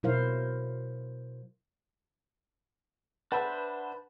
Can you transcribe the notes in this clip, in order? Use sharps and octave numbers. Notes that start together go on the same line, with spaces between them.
B2 F#3 E4 A#4 C5 F5
D4 B4 C5 E5 F#5 A5 B5